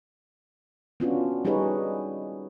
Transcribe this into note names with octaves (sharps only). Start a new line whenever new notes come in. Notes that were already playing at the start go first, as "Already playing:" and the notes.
B3 C#4 D4 F4 F#4
G3 D#4 G4 G#4 B4 C#5